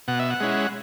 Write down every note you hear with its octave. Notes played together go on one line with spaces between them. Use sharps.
B2 F#5
E5
F#5
G#3 C#4 E4